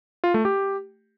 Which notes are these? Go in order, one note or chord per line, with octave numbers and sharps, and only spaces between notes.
F4
A3
G4